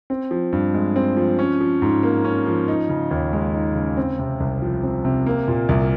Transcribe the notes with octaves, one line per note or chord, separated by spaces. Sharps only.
C4
F3
G2
G#3
C4
F3
C#4
F3
G#2
A#3
C#4
F3
D#4
C#3
D#2
G#3
D#4
C#3
C4
C3
C2
F3
C4
C3
A#3
A#2
C2